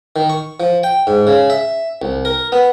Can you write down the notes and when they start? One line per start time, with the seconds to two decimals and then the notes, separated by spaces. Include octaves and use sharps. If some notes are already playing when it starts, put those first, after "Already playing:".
0.16 D#3
0.30 C#6
0.60 F3
0.83 G5
1.07 G#2
1.27 C#3
1.50 E5
2.02 C2
2.25 A#4
2.52 B3